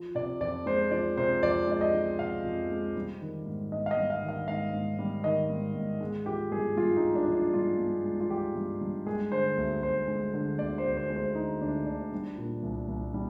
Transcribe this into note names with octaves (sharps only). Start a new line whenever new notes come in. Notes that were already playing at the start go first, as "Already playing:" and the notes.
Already playing: F3
C3 D5
F2 D5
G#3 C5
F3 D5
C3 C5
F2 D5
G#3 D5
D#5
F3
C3 F5
F2
G#3
G3
D#3
G#2
G#2 D#5
F5
D#5
G3
F5
D#3
F5
G#2 F5
G#2
G3
D#3 D#5
G#2
G#2
G#3
F3 G4
G2 G#4
G2 F4
D#4
G#3
D4
F3
D4
G2 F4
G2
G#3
F4
F3 G4
G2
G2
G#3 G#4
D3 C5
D2
D2 C5
G#3
D3
D2 D5
C5
D2
C5
G#3
C5
D3 D#4
D2 D4
D2 D4
G3
A#2
C2
C2
G3